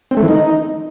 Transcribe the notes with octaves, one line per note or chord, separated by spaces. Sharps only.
C4
A3
E3
D#4